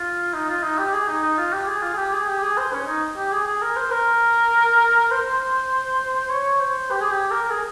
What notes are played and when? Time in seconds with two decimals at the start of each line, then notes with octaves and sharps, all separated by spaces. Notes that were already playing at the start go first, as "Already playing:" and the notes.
Already playing: F4
0.33 D#4
0.49 F4
0.63 D#4
0.78 G4
0.93 G#4
1.08 D#4
1.23 D#4
1.38 F4
1.53 G4
1.67 G#4
1.82 F4
1.93 G#4
1.97 G4
2.13 G#4
2.28 G4
2.42 G#4
2.57 C5
2.73 C#4
2.87 D#4
3.17 G4
3.32 G#4
3.47 G#4
3.62 A#4
3.77 C5
3.91 A#4
5.11 C5
6.30 C#5
6.61 C5
6.91 G4
7.01 G#4
7.11 G4
7.31 A#4
7.44 A#4
7.51 G#4